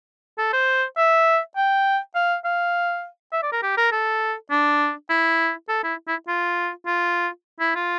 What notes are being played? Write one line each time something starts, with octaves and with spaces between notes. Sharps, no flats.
A4
C5
E5
G5
F5
F5
E5
D5
A#4
G4
A#4
A4
D4
E4
A4
E4
E4
F4
F4
E4
F4